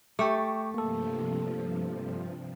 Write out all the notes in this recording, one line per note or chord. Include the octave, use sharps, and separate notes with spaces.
A3 G4 G5 C#6 D6
G2 C3 F3 A#3 A4